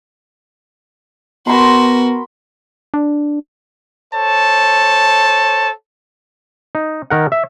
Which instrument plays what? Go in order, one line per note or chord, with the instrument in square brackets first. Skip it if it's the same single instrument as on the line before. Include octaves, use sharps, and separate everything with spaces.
[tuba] B3 [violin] F#4 A#4 [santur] B5 C6
[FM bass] D4
[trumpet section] A4 C5 C#5 A5
[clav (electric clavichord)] D#4
D#3 A#4 F#5
E5